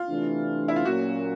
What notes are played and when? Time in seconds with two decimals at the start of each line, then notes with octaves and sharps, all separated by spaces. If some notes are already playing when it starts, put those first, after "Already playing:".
Already playing: F4
0.08 C3 E3 A3 D4
0.68 E4
0.76 F4
0.85 A#2 F#3 A#3 C#4 F#4